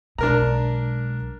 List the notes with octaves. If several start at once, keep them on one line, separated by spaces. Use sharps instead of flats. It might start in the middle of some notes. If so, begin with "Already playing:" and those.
B1 G#3 D4 A#4 A#5